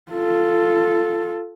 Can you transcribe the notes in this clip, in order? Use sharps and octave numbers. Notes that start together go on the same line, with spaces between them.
F4 A4